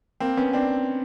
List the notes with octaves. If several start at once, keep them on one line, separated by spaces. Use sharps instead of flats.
A#3 C4
B3 C#4
C4 D4